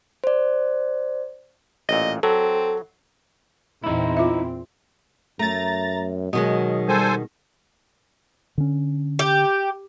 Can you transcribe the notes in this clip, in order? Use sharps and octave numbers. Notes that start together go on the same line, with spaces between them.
C5 D5
A1 A#2 D#5
F#3 C4 A4
E2 A#2 C4 D#4 E4
F4 E5
F#2 A3 A#5 A6
B2 D#3 F#3 G#3 D#5
G3 A4 C5 G#5
D3 C#4
G4